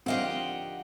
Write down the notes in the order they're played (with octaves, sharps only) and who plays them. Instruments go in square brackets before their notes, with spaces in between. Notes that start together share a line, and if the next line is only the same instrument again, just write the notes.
[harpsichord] D3 D#3 F3 [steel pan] C4 F5 [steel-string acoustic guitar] G4 D#5 F#5